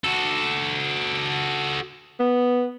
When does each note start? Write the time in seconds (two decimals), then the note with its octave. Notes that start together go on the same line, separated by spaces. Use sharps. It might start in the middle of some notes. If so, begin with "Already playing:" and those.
0.04 F#4 A4
2.20 B3